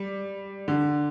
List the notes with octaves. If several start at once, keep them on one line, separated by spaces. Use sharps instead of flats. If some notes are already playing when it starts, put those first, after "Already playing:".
Already playing: G3
D3